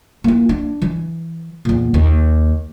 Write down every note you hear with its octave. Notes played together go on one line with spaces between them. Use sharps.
A#3 E4
D4
E3
E2 A#2
D#2